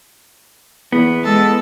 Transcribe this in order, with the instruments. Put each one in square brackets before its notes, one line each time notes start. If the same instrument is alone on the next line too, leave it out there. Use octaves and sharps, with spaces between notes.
[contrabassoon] E2 [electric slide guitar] B3
[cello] G#3 A4